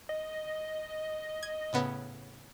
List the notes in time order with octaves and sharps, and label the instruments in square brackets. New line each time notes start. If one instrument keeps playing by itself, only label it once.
[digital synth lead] D#5
[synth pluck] G#6
A2 C#3 B3